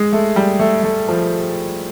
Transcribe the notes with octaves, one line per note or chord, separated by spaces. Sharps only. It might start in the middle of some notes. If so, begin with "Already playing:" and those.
Already playing: G#3
A3
G3
A3
A3
F3